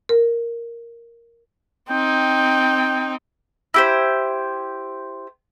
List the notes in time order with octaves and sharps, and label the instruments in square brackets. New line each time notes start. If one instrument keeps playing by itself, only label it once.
[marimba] A#4
[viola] C4 D#4 [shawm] G5
[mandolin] E4 G4 C5